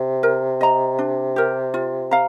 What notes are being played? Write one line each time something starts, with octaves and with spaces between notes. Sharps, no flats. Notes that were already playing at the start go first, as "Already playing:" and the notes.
Already playing: C3
A#4
D#5 A#5
D4
G4 A#4
F4
F5 A#5